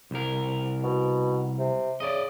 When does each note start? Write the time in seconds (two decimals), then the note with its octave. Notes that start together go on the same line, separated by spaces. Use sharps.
0.11 C2 A#4
0.83 B2
1.59 C3
2.00 C#3 D5 D#5